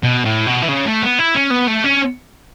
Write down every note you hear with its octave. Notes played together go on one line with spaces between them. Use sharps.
B2
A2
B2
E3
C#3
A3
B3
E4
C#4
B3
A3
C#4